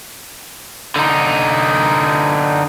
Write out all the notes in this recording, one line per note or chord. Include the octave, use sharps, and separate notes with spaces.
D3 D#4